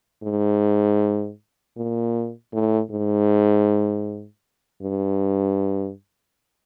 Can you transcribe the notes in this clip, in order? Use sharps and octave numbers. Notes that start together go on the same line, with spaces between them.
G#2
A#2
A2
G#2
G2